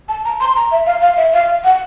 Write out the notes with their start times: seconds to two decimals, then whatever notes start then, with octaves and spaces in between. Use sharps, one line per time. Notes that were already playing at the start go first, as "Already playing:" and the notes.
0.09 A5
0.25 A#5
0.40 C6
0.55 A#5
0.72 E5
0.86 F5
1.02 F5
1.17 E5
1.33 F5
1.64 F#5